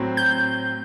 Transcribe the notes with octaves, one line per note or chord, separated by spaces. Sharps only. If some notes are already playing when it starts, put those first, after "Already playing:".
Already playing: A2 F#3 C4 F#4 C5
G6